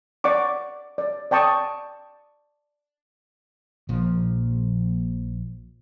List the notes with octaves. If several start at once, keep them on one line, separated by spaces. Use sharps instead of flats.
D5 F#5 C#6 D6
D5
D5 G5 A5 C#6 D#6
A#1 A#2 F3